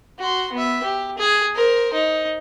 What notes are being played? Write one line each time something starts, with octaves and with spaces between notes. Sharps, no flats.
F#4 C6
B3 E5
G4
G#4
A#4 C5
D#4